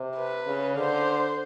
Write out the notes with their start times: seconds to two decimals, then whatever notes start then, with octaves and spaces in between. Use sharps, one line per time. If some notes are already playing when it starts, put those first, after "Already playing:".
Already playing: C3
0.17 B4
0.47 C#3
0.77 D3 C5